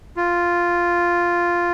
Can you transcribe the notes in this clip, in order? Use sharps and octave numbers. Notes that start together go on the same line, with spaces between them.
F4